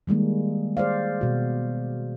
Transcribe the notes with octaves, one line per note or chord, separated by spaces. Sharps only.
D#3 G3 G#3 A#3
G#4 C5 D5 F5
B2 F#4